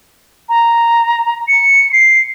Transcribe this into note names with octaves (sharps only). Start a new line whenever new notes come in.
A#5
C#7
C7